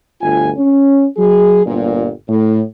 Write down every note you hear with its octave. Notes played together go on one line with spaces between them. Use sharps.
G1 D2 F4 G#5
C#4
F#3 G#4
G1 A#2
A2